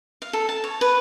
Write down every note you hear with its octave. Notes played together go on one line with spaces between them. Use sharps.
F5
A4
A5
C#5
B4